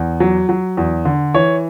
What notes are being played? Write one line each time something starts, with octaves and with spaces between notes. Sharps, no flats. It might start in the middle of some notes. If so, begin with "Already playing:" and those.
Already playing: E2
F#3
F#3
E2
D3
E3 C#5